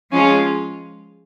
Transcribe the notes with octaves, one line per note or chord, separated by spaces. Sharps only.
F3 G#3 C#4 F4